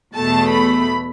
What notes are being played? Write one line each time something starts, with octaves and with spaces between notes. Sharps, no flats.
E2 B2 A3 A5
B5